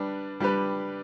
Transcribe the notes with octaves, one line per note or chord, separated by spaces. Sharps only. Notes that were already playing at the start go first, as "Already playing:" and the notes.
Already playing: G3 D4 B4
G3 D4 G4 B4